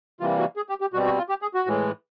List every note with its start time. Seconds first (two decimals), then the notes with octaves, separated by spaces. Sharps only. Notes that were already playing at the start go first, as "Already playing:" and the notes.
0.20 C3 E3 G3 A#3 F4
0.39 F#4
0.56 G#4
0.69 G4
0.81 G4
0.93 B2 G3 C4 F#4
1.05 F#4
1.18 F4
1.29 G4
1.42 G#4
1.54 F#4
1.66 A2 E3 G#3